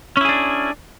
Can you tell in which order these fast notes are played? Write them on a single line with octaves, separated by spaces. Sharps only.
C#4 E4 G#4 D4